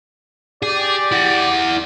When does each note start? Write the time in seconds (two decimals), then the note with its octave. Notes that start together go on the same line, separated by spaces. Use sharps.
0.62 G4 G#4 D5
1.12 E4 F#5